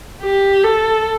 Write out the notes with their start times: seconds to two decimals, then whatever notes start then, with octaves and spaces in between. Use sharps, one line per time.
0.22 G4
0.64 A4